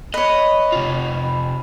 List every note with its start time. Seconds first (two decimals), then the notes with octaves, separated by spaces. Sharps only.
0.14 B4 C#5 D#5
0.72 C3 F4